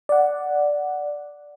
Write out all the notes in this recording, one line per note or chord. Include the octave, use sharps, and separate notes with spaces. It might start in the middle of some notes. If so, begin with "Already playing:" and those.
D5 F#5